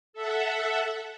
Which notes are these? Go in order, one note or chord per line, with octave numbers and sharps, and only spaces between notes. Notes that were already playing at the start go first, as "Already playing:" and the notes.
A4 E5 F#5